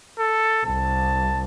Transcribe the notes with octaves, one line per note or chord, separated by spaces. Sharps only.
A4
C2 A5